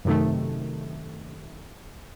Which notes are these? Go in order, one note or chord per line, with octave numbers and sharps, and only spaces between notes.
F#2 C3 D#3 A3